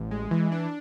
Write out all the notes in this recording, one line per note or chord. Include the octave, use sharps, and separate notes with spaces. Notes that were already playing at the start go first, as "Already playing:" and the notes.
Already playing: A1
G#3
E3
D4